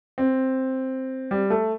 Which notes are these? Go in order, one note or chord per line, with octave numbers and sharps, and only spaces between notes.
C4
G3
A3